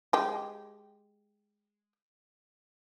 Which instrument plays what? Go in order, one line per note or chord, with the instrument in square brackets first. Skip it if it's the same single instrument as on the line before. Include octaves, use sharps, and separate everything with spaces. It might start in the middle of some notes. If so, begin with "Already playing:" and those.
[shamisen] G#3 G4